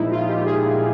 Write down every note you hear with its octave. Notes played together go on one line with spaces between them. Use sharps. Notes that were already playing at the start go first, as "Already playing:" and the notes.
Already playing: A#2 F3 G#3 D#4 E4
F4
G4
G#4